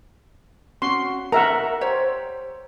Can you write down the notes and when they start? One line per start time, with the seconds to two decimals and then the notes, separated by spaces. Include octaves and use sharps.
0.82 C#4 F#4 C6
1.32 A#4 E5 F#5 A#5
1.81 G4 C5 C#5